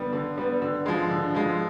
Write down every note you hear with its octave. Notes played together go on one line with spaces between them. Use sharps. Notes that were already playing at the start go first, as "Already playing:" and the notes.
Already playing: D3 G3 B3
D3
G3 B3
D3
F3 G#3
D3
F3 G#3